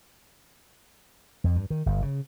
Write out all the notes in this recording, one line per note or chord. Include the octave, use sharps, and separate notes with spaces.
F2
G2
D#3
G1
C#3